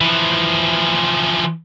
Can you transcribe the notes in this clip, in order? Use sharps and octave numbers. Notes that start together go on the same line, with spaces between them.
E3 F3